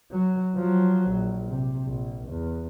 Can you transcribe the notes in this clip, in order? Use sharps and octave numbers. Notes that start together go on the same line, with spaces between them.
F#3
F3 F#3
A#1
C3
A#1
E2